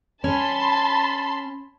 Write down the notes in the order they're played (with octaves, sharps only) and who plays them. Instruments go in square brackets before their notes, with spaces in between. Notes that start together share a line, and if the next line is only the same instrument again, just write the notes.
[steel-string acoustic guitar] C#4 [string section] A5 B5 C6